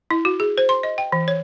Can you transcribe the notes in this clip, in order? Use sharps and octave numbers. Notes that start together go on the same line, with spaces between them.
E4
F#4
G#4
C5
C6
D#5
G5
E3
C#5